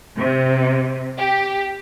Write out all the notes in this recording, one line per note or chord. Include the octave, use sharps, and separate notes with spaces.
C3
G4